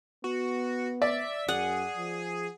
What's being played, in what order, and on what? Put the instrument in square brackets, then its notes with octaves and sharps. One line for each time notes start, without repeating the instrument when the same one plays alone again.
[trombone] B3 [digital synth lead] F#4
[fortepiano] D5 [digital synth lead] E5
[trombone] F#2 [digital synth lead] G#4 [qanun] F#5
[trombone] F3